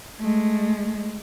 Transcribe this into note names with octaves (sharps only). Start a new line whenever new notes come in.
G#3 A3